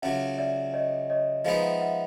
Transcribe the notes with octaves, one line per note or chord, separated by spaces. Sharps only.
C#2 C#3 F#3 E5 F#5
D5 E5
C#5 D#5
C#5 D#5
F3 G#3 B3 D#4 D#5 F5
E5 F#5
E5 F#5